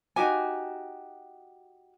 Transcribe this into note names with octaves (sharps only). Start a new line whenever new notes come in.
D#4 F#4 G4 G#5